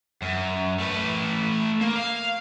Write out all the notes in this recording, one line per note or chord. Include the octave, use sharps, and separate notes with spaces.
F#2
A3 B4
A#3
F5